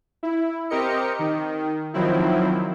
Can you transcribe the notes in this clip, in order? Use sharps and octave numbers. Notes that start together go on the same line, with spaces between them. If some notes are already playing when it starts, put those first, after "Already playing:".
E4
C4 G4 A#4 D#5 C#7
D#3
D#3 F3 F#3 C4 E4